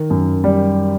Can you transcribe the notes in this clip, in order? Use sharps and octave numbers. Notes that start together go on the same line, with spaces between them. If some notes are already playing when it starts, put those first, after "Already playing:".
Already playing: D#3
F#2
G3